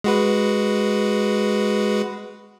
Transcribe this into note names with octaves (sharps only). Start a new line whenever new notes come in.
G#3 F#4 B4